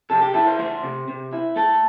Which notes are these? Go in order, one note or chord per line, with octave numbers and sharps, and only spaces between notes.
C3 A4
G4
E4 A4
C5
A3 C5
C3
C3
E4
A3 A4